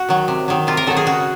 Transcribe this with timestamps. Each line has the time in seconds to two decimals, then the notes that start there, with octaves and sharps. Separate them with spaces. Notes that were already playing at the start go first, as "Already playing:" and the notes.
Already playing: F#4
0.09 D#3 F#3
0.28 C3
0.48 D#3 F#3
0.67 C3 F4
0.77 A#4
0.87 D#3 F#3 A4
0.97 G#4
1.06 C#3 F#4